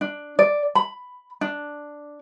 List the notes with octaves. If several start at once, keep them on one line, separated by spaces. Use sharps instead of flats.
D4
D5
B5
D4